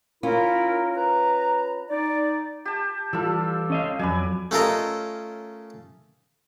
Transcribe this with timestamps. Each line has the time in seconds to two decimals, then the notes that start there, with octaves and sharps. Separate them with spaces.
0.23 C#4 E4 F4 A#4
0.96 B4 A#5
1.90 D#4 D5
2.65 G4 A5
3.13 E3 G3 F4 A4 E6
3.70 C#4 D#5 F5
3.99 F2 F#3 B4 D5 G#5
4.51 A3 C#4 F4 A4 A#4 D#5